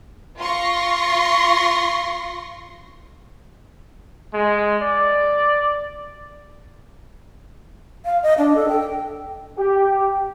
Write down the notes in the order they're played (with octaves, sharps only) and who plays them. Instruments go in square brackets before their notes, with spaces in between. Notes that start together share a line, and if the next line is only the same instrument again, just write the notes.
[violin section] F4 C6 C#6 A#6
[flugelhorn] G#3
D5
[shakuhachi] F5
D#5
D4
A4
G5
[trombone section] G4